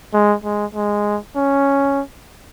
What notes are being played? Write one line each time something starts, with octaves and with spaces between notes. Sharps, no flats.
G#3
G#3
G#3
C#4